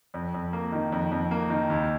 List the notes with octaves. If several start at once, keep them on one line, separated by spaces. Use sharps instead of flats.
F2
F2
A#3
D#3
F2
F2
A#3
D#3
D#2